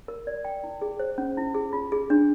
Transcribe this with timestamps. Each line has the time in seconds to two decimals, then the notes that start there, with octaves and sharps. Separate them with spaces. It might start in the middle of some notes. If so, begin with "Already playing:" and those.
0.08 A#4
0.27 D5
0.45 G5
0.64 E4
0.82 G#4
0.99 C5
1.18 C#4
1.37 E4
1.54 G#4
1.73 F4
1.92 G#4
2.10 D4